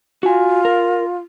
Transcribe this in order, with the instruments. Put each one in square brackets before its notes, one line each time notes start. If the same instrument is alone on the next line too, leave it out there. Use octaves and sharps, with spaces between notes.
[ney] F4 [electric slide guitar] F#4 G#5
[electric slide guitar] A#4